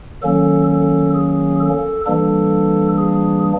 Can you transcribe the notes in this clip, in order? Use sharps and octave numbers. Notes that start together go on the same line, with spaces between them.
D#3 F#3 A#3 C#4 A4
A4
G#4
A4
E3 G3 A#3 D4 A4
G#4